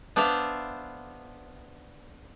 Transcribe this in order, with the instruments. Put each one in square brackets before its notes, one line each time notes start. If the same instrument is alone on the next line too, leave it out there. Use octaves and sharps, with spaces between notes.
[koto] B3 D4 C5 D5 E5 F5